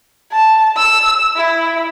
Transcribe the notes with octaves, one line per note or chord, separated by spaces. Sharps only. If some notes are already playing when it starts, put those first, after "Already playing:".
A5
E6
E4